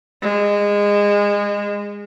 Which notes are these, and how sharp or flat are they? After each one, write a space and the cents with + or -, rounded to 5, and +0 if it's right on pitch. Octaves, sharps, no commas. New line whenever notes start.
G#3 -25